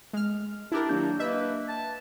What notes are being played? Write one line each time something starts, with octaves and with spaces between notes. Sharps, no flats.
G#3 F6
D4 E4 G4 A#4
D#3 F#3 A#3 D4 G6
A#3 B4 D#5 E5
A5